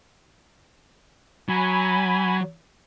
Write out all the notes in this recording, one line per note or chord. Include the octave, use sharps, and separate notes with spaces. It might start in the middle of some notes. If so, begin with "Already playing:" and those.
F#3 G#5 B5